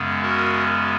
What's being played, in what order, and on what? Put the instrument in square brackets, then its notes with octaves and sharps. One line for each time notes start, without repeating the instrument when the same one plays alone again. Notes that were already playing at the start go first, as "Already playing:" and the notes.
Already playing: [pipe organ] F#2 C#3 G#3 B3
F#4 A#4